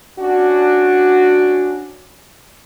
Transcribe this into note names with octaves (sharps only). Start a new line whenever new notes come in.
C#4 D4 F#4